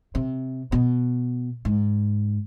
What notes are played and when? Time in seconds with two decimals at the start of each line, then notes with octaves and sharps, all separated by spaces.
0.15 C3
0.72 B2
1.65 G#2